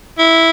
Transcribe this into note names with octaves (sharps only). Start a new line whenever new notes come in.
E4